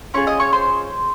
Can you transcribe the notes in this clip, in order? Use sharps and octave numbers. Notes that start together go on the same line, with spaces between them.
C#4 F4 G#4 C#5 C#6
D#5 D#6
C#5 C#6
C5 C6